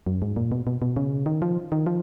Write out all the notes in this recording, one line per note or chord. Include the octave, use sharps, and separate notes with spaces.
F#2
G#2
A#2
B2
B2
B2
C#3
D#3
F3
D#3
F3